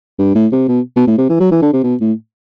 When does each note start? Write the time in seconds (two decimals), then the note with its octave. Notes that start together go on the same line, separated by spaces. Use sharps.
0.19 G2
0.35 A2
0.52 C3
0.69 B2
0.96 B2
1.07 A2
1.18 C3
1.29 E3
1.40 F#3
1.51 E3
1.62 D3
1.73 C3
1.84 B2
2.01 A2